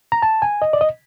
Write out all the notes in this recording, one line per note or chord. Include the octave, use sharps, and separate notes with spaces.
A#5
A5
G#5
D#5
D5
D#5